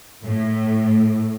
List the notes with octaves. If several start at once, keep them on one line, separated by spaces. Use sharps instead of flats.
A2